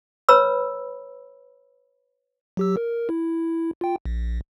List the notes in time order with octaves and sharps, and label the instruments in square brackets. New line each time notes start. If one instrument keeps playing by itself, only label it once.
[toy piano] B4 C#5 A#5 B5 E6
[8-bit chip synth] F#3 G4 E6
A#4
E4
F4 G5
A#1